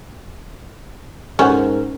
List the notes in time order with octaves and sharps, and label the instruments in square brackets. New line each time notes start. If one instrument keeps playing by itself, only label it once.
[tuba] G#2 [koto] C#4 [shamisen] A4 C5 F#5 [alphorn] A#4